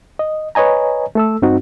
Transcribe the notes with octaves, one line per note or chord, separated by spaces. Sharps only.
D#5
B4 C#5 D#5 G#5 A#5
A3 A4 E6
G2 C4 D#4 F#4